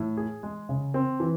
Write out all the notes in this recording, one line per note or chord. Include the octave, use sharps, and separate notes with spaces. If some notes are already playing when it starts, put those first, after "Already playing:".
Already playing: A2
G#4
G#3
C#3
C4
E3